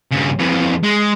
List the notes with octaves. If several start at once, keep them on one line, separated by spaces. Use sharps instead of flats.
G2 C#3
F2 E3
G#3